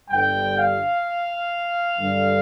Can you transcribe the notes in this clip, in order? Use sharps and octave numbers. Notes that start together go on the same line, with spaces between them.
G1 G2 G3 G5
F5
G2 D3 G3